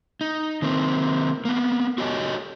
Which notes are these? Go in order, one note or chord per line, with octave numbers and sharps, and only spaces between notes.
D#4
D#3 A#3 C4
A#3 B3
F#4 G4 C#5 D#5 G#5